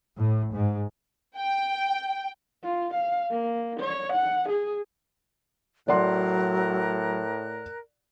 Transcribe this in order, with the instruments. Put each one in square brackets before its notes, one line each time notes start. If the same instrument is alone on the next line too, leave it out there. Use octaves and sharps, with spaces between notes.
[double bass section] A2
G#2
[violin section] G5
[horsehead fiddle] F4
F5
A#3
C#5
F#5
G#4
[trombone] A2 [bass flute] F#3 [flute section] A#4 F#6 [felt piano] D5 F#5 C6